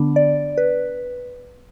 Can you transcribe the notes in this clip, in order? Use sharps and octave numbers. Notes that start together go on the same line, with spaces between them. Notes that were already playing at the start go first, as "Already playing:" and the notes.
Already playing: D3 B3 D4
D5
B4